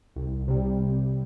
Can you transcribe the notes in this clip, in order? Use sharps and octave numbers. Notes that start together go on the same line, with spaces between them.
C2
C3 G3
C2